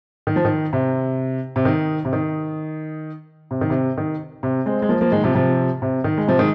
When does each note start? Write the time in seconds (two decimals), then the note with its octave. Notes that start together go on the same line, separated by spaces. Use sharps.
0.27 D#3
0.36 F3
0.45 D#3
0.73 C3
1.56 C3
1.65 D#3
2.05 C3
2.13 D#3
3.51 C3
3.61 D#3
3.70 C3
3.97 D#3
4.43 C3
4.66 G#3 C4
4.82 G#3
4.89 F3 A#3
5.01 F3 A#3
5.12 D#3 G#3
5.24 C3 F3
5.35 C3 F3
5.82 C3
6.04 D#3
6.18 G#3
6.28 C3 F3
6.39 D#3 G#3